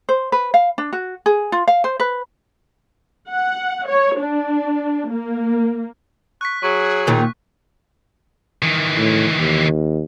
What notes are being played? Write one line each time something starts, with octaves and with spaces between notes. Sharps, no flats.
C5
B4
F5
D4
F#4
G#4
F4
F5
C5
B4
F#5
C#5
D4
A#3
C#6 F#6 B6
F#3 G#4 C#6
D#2 A#2 D#3
D#3 E3
A2
D#2